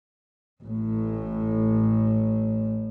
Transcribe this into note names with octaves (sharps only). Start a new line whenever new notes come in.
A1 A2